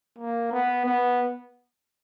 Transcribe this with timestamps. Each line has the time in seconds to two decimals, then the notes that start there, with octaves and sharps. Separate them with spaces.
0.18 A#3
0.51 B3
0.86 B3